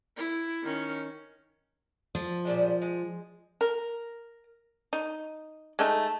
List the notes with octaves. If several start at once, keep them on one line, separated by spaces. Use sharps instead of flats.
E4
D#3 C#4
F3
A#2 G3 G#3
G#3
A#4
D#4
G#3 A3 D#4